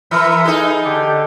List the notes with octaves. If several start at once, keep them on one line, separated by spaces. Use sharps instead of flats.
E3 A#4 B4 E5
D#4 G#4 A4
D3 G4